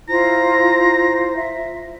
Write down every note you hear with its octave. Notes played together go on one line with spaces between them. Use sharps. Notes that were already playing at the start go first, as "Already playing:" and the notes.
E4 F4 C5 A#5
E5